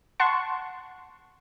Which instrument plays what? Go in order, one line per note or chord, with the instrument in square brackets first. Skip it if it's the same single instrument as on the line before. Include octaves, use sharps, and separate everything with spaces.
[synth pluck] F#5 A5 C6 C#6